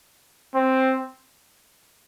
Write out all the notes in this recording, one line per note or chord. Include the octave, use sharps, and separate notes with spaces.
C4